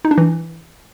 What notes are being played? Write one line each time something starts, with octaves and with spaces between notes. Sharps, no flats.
D#4
D4
E3